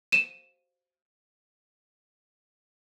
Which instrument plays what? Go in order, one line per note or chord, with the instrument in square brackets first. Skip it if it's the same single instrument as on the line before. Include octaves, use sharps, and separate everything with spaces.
[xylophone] D#7 E7